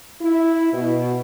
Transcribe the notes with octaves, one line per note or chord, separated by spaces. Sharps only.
E4
B2